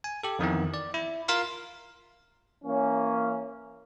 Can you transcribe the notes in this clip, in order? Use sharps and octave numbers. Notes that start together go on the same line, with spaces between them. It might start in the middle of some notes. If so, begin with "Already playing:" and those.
G#5
G4 A4
F2 D#3 E3 B3
D5
E4
F4 A#4 F5 C6
E3 A#3 C#4